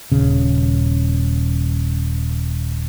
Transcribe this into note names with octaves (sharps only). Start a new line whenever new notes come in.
D#1 C#3